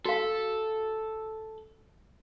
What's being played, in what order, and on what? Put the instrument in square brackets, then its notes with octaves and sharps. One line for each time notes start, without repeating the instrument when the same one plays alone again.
[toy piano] F#4 F5 [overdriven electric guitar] A4